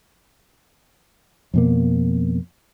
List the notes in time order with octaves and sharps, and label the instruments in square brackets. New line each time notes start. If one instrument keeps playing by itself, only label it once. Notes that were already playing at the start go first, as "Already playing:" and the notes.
[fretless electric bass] F2 B2 A#3